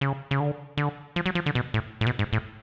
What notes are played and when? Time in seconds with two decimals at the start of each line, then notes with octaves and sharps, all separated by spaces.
0.01 C#3
0.31 C#3
0.40 D3
0.77 D3
1.16 F3
1.26 F#3
1.35 F3
1.46 D3
1.55 B2
1.74 A2
2.01 A2
2.06 B2
2.19 G#2
2.33 A2